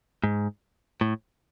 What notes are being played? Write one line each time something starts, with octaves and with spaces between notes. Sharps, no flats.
G#2
A2